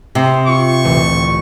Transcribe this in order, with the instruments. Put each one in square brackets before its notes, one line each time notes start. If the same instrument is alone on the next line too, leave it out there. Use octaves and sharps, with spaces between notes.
[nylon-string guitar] C3 [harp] A#5 C6 D#6
[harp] F4 [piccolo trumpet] C#6
[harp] A1 D2 A#2